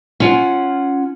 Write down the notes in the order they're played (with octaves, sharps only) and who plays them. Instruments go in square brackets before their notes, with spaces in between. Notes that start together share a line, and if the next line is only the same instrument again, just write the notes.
[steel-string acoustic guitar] C#4 F4 F#5